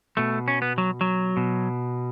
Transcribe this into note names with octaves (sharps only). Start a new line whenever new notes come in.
B2 A3
C#4
B3
F#3
F#3
B2